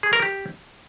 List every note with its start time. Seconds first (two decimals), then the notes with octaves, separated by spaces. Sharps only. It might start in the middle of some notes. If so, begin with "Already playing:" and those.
0.03 G#4
0.13 A#4
0.22 G4